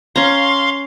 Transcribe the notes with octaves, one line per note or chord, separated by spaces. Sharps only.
C#4 F5 A#5 C6